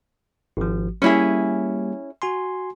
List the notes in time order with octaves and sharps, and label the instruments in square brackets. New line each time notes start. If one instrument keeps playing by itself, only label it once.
[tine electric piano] G#1 F3
[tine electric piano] G3 A#3 G4 [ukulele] C#4 E4 G#4
[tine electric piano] F#4 G#5 C6